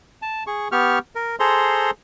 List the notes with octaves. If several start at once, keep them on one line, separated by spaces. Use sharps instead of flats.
A5
G#4 C#6
B3 G4 C#6 F6
A#4
G#4 A4 C5 A#5 C6